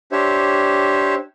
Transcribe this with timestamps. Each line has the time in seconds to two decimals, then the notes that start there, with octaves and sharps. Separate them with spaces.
0.12 D4 G4 C5 C#5 E5